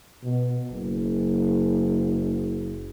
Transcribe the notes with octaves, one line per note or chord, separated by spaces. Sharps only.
B2
F#1